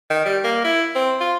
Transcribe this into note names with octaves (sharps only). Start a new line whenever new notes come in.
D#3
G3
A#3
E4
C4
F4